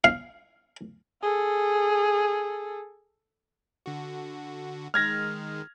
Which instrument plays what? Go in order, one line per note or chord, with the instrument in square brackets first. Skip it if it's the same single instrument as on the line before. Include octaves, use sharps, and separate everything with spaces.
[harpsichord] F5
[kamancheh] G#4 A4
[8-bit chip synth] D3 F#4
[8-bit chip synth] D#3 G#3 [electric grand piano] F6 G#6 A#6